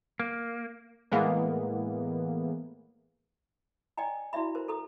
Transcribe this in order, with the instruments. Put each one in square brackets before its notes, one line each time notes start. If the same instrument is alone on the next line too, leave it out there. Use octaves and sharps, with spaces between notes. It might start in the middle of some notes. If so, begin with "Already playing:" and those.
[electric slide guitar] A#3
[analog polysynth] A2 E3 G#3 A#3 B3
[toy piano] D5 D#5 G5 G#5 A#5
E4 F#4 D5 E5 B5
A#4 C5
A4 A#5 D#6